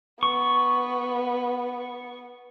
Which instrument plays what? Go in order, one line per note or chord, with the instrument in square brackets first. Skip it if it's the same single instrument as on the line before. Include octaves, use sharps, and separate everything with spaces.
[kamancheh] B3 [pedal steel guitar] C#6